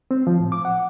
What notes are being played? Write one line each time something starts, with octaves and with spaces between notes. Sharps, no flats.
C4
F3
A2
D6
F#5